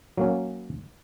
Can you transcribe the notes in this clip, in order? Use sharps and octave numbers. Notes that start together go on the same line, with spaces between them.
F#3 A#3 C#4